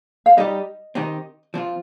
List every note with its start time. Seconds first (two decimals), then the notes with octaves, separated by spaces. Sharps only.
0.26 F5
0.37 G3 D#4 G4 D#5
0.95 D#3 C4 D#4 G4
1.54 F3 C4 F4